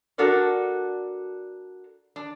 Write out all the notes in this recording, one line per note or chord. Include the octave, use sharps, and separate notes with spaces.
D4 F#4 A4 A#4 D5
D4